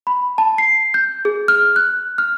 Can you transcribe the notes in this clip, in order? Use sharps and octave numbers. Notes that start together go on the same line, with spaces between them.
B5
A5
C7
G6
G#4
F6
F#6
F6